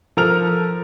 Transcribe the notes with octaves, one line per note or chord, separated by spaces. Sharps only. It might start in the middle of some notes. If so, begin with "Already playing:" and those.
F3 A4 A#4 A#5 F6 F7